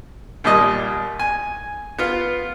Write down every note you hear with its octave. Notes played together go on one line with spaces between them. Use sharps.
D#2 A#2 G3 D#5
G#5
B3 F4